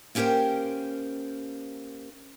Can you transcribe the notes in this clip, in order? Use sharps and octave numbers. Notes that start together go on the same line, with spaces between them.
A#3 C#4 G4 A#4 C5 G5